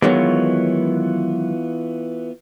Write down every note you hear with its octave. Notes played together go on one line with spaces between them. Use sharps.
D#3 E3 F#3 G#3 B3 F4 C#5